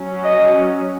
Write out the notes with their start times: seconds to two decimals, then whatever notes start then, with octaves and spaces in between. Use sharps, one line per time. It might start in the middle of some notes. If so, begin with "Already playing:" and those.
Already playing: F#3 C#4
0.24 D#5